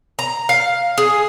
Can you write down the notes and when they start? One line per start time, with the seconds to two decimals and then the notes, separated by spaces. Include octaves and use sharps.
0.19 A#5
0.49 F5
0.98 G#4